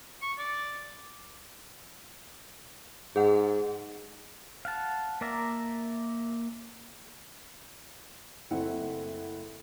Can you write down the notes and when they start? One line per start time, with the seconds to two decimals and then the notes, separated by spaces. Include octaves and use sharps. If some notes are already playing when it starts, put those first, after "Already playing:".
0.22 C#6
0.39 D5
3.16 G#2 G#4 F#5
4.65 F5 F#5 A5
5.21 A#3 A#4 D5 E5 A#5
8.51 F#1 A3 C4 E4 F#5